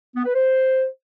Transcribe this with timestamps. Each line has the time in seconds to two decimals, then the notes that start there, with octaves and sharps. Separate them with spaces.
0.15 B3
0.25 B4
0.35 C5